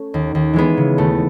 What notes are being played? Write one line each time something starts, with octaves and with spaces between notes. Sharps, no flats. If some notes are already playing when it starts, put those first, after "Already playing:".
Already playing: A3 C#4
D#2
D#2
E3 G#3 B3
C#3
D#2 A3